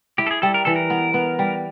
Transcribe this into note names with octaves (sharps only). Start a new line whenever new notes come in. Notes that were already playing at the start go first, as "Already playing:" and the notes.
E4 G4
A4
G#4
G3 A4
A#4
E3 A4
A#4
B3
B3
G3